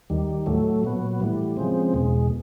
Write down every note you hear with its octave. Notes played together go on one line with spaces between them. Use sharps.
D#2 D#3 G3
A2 F#3 A3
A#2 F#3 B3
A2 E3 G3
C#3 F3 G#3 C4
E2 B2 G#3